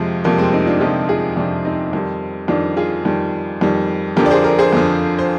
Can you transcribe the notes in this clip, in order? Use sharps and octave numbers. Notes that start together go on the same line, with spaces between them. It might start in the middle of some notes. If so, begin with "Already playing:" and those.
Already playing: F2 C3 F3 G#3
F2 C3 F3 G3 A#3
G#3 C4
C4 D#4
D4 F4
F2 C3 F3 D#4 G4
F4 G#4
F2 C3 F3 D4 F4
C4 D#4
F2 D#3 G3
F2 D#3 G3 D4 F4
F4 G#4
F2 D#3 G3
F2 D#3 G3
F2 D3 F3 G4 A#4
D5
G#4 C5
A#4 D5
G#4 C5
F2 D3 F3
C5